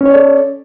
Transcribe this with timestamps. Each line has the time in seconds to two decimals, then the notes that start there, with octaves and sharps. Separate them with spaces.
0.01 C#4
0.06 C#5
0.10 D5
0.15 A4